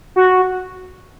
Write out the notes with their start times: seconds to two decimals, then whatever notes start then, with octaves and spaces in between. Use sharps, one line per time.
0.16 F#4